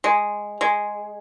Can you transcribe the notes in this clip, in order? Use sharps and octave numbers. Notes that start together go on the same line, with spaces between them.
G#3
G#3